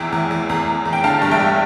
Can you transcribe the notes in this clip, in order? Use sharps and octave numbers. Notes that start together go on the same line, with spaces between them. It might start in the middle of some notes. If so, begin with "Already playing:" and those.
Already playing: E2 E3 E5 G5
E2
E2
E2
E2
E2
G5
D3 F5 A5
G2
E5 G5
G2